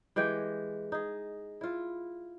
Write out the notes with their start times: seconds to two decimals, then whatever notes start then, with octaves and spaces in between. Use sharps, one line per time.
0.16 E3 G#3 G4 G5
0.92 D#4 G#4
1.61 E4 F4